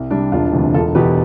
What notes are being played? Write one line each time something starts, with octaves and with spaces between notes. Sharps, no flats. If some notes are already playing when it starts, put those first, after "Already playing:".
Already playing: C2
C3 G3 D4
E1 D4 F4
D2 C3 E3
E1 F4 A4
E2 B2 G4 B4